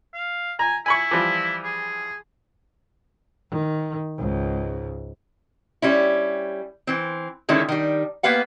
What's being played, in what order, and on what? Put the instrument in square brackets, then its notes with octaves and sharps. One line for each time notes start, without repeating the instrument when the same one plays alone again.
[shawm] F5
[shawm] G#5 [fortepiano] A#5
[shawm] E4 [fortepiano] G#5 B5 C#6
[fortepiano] E3 F3 G3
[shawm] G#4
[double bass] D#3
C#2 G#2
[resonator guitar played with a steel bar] G3 C#4 E4
E3 C4
D3 D#3 G#3 C#4 E4
D#3 G3
A#3 B3 B4 F5 F#5